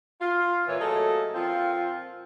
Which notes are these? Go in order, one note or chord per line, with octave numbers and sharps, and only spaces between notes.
F4
A#2 E3 C#5
F#3 A3 A#3 G#4 A4 D#5
A#2 F3 C4 F4